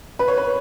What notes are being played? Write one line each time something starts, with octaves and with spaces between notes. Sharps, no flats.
B4
C#5
B4